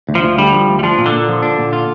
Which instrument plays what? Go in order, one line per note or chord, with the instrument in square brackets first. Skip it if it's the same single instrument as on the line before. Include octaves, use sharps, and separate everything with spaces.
[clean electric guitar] D2
[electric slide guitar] F3
[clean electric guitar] D2
[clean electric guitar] D3 [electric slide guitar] G3
[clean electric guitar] F3
D2
[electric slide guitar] G3
[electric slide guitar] F3 [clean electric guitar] D4
[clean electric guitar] A#2
[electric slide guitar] D3
[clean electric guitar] A#2
F3
D4
A#2
F4